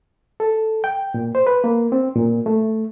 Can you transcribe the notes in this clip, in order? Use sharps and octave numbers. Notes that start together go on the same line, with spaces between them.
A4
G5
A#2
C5
B4
A#3
C4
A#2
A3